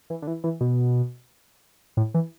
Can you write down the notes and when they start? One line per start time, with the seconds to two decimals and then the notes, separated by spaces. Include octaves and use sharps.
0.10 E3
0.22 D3
0.27 E3
0.44 E3
0.61 B2
1.97 A2
2.14 E3